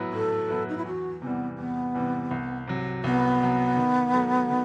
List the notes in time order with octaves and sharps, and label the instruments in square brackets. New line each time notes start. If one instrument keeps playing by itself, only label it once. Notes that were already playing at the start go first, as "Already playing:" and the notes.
Already playing: [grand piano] A2 F#3 B3 E4 B4
[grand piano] A2 [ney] A4
[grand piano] F#3 B3 E4 B4
[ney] D#4
E4
[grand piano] E2 [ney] F#4
[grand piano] C3 E3 G3 [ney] B3
[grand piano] E2 [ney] B3
[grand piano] C3 E3 G3
C2
C3 F#3
[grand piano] C2 [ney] B3
[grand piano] C3 F#3
D#3
F#3 A3
D#3